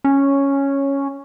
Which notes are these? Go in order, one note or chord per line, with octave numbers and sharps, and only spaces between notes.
C#4